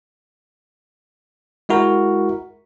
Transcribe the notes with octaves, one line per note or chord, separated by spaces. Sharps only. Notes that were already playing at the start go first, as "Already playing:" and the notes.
G#3 E4 F#4 A#4